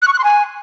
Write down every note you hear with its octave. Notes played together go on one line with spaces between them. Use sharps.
F#6
C#6
F#6
C6
G#5